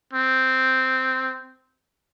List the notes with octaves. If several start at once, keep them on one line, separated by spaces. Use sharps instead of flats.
C4